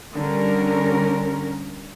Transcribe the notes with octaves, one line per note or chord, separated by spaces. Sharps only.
D3 G3 C#4 A#4